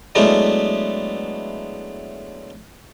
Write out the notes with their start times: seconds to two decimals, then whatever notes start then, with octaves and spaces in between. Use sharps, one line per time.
0.15 F#3 G#3 A3 B3 D4 E4